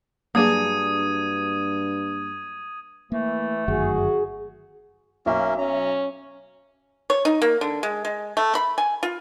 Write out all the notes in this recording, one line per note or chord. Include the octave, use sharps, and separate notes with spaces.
G2 F#3 A#3 D4 G#4 D#6 G#6 D#7
E3 A3 A#3
G1 F#2 D#3 F#4 G#4
B1 A#3 C#4 A#4 E5
C#4 A#5
C#5
D#4
A#3
D3
G#3
G#3
A3
B5
G#5
F4